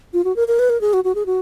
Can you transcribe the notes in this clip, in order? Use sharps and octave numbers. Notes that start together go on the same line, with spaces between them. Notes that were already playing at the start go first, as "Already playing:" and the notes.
F4
F#4
A#4
A#4
B4
A#4
G#4
F#4
F#4
G#4
F#4